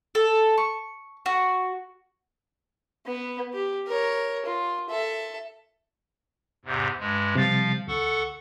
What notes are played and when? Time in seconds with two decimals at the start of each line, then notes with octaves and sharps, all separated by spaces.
0.15 A4
0.58 C#6
1.26 F#4
3.06 B3
3.54 G4
3.87 A#4 C#5
4.46 F4
4.90 A4 E5
6.65 E2 G#2 C3
7.00 G2 G#3
7.35 C3 F3 G3 F5 A6
7.88 D2 A4 F#5 C#6